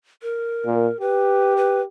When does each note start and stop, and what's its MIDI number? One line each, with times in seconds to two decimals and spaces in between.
0.22 0.99 70
0.66 0.88 46
1.01 1.85 67
1.01 1.56 71
1.57 1.82 71